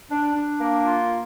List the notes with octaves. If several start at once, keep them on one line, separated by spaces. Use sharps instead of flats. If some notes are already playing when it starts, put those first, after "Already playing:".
D4
D4
A#3
F4